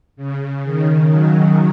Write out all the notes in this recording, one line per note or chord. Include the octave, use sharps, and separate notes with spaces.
C#3
D#3
C#3 F#3